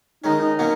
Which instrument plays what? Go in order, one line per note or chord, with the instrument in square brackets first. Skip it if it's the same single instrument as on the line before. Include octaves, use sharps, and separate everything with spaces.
[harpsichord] D#3 G#3 C#4 [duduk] D#4
[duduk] D#4
[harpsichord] B2 F#3 A#3 C#4